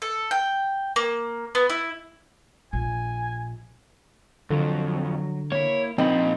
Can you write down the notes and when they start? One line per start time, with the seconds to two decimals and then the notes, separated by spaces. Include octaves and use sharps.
0.02 A4
0.31 G5
0.96 A#3
1.55 B3
1.70 E4
2.73 A#1 G#5
4.51 F2 D3 F#3
5.52 A#3 E4 C#5
5.98 A#2 F3 A#3 C4 D#4 C5 B5